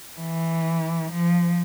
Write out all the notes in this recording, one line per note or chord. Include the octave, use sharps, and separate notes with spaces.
E3
F3